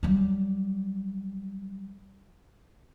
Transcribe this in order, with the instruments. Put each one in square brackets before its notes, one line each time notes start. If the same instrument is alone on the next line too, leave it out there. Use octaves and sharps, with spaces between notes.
[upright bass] F#3 G3